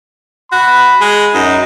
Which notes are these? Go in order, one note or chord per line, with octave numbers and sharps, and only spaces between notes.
F#4 B5
G#3
F#2 D#4